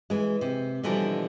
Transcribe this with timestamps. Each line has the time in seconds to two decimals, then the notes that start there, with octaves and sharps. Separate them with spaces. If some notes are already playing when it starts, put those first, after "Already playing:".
0.10 E3 G#3
0.41 C3
0.83 B2 D3 E3 F3 G3 A#4